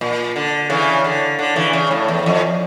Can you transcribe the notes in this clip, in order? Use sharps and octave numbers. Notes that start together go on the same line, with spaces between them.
A#2
D3
C#3 E3
D3
D3
C#3 E3
C#3
A2
E2
F2